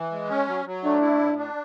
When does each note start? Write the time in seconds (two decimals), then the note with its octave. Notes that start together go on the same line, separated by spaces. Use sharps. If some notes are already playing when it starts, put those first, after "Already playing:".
Already playing: E3
0.11 G#3
0.30 C#4
0.47 F#3
0.65 F#3
0.83 A3 D4
1.01 E4
1.19 A2
1.37 D4